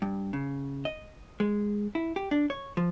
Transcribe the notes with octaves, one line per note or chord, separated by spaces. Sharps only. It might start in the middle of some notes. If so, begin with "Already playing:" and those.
G2
C#3
D#5
G#3
E4
G4
D4
C#5
F3